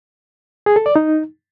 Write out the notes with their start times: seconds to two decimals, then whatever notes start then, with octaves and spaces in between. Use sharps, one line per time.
0.66 G#4
0.76 A4
0.86 D5
0.96 D#4